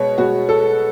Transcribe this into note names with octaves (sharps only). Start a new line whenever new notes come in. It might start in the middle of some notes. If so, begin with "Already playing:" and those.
Already playing: B2 G#3 B3 C#5
B2 G#3 B3 F#4
A4